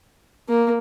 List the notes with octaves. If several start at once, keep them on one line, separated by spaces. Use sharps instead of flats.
A#3